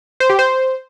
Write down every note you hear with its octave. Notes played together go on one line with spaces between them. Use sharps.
C5
G4
C5